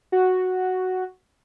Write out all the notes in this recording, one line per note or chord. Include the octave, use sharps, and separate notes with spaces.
F#4